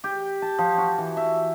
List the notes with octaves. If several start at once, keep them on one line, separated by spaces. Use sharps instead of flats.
G4
A5
F3
F#4
E3
E5